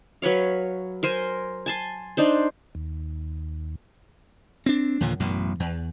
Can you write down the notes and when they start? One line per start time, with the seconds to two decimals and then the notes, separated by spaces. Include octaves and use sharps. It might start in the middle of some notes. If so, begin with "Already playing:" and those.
0.22 F#3 B4 C#5 F5
1.03 A#4 C5 G#5
1.66 G#5 A5 C6
2.17 D4 D#4 C5
2.75 D#2
4.66 C4 D4
5.01 D#2 A#2 D3 F3
5.20 A1 F#2 B2
5.60 E2